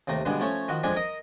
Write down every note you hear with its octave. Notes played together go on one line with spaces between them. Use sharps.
D#2 C3 A3 D#4
G2 B2 D3 G#3 B3
F3 A3 C#4 A4 C#5
D#3 F3 F#4
F2 F3 G#3 D4 G#5
A#4 D#5 D#6